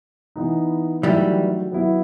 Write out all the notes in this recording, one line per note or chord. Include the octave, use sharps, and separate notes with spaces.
E3 B3 D#4
D#3 E3 F#3 G3 A3
F#3 B3 E4